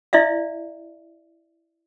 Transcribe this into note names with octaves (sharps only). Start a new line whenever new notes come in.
E4 D5 E5 F5